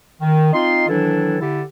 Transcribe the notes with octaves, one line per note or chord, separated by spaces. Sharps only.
D#3
C4 D#4 F4 D#5 C6
D#3 E3 F#3 D4 E4 A4
D3 E4 G4 A4